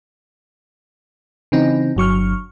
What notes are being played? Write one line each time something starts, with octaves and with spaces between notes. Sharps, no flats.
C#3 E3 C4 D#4
G1 F#3 C#6 F6